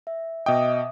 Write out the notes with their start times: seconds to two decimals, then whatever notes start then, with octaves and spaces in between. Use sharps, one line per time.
0.07 E5
0.46 B2 D#5 E5 G5 D6 D#6